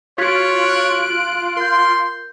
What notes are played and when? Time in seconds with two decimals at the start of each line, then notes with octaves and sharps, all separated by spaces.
0.18 F4 F#4 C#5 F#6 G#6 B6 D7
1.57 A#4 C6 G6